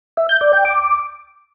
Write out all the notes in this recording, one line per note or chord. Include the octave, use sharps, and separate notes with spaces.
E5
G6
D5
G5
D6